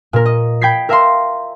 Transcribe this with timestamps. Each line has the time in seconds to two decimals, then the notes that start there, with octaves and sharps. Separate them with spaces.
0.13 A#2 A#4
0.26 D#5
0.61 G5 B5 G#6 B6 C7
0.89 A#4 E5 F5 A#5 C6